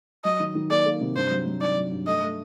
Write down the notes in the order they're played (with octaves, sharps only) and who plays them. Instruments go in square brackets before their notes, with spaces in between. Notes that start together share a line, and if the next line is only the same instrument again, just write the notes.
[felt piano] F#3 [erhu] D#5
[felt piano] D#3
D#3
[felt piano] A#3 [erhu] D5
[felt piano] A#3
C3
[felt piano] G2 [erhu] C5
[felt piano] F#3
F#3
[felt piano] D#4 [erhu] D5
[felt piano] F#3
G2
[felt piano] A3 [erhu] D#5
[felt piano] A3